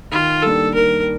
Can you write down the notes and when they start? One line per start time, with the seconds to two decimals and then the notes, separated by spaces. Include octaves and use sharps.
0.12 D#3 F4
0.43 G3 A#3 D4 A4
0.74 D#3 A#4